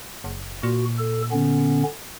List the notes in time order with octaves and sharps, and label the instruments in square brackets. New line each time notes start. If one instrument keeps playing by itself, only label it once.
[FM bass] F#1
[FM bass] A#2 [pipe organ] F#4
[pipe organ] A4
D3 B3 C#4